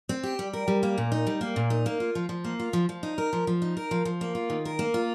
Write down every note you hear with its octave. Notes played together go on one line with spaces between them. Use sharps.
C4
G4
G3
A#4
G3
A#3
A#2
D#4
G3
A#3
A#2
D#4
A#3
F4
F3
F3
A#3
F4
F3
F3
D#4
A#4
F3
F3
D#4
A#4
F3
F3
A#3
F4
D#3
A#4
A#3
F4